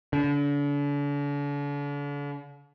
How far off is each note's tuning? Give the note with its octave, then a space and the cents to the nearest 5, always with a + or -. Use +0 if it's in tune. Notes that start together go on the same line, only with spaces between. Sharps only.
D3 -40